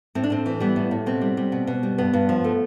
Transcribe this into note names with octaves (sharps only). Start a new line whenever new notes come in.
A2 C4
D4
A2 C4
E3
G3 B3
A2
A2
B2 C4
G3
G3
B2
B2
G3
G2 B3
G2
F3
A3